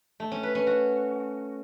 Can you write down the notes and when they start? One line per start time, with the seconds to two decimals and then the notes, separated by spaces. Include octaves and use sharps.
0.20 A3
0.32 C#4
0.43 B4
0.55 C#4
0.67 F#4